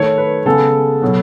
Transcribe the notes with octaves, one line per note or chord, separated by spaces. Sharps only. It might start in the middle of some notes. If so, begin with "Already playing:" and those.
Already playing: D#3 A3 C#5
B4
C#3 G#3 B3 A4
B2 F#3 B3